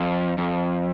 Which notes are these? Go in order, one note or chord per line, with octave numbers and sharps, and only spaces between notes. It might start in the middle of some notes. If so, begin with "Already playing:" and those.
Already playing: F2
F2